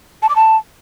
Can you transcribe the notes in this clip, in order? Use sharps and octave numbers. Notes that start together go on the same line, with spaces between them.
A5
D6
A5